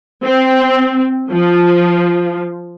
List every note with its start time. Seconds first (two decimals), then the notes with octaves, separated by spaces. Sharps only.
0.24 C4
1.30 F3